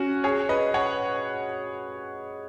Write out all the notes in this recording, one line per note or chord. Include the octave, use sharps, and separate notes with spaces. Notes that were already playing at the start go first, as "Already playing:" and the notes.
Already playing: C#4 F#4
G#4 C#5
B4 D#5
C#5 F#5